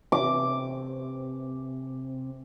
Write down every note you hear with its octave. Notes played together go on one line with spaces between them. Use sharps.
C3 D6